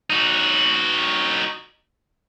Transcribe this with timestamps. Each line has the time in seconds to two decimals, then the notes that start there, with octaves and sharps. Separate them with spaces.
0.10 D#4 F#4